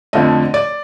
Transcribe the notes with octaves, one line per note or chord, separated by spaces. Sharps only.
F2 D3 F3 A3 D#5
D5